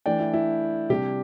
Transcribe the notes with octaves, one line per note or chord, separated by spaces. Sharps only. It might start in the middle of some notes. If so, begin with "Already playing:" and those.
E3 A3 D4 D5 G5
E4
E4
C3 G3 D4 G4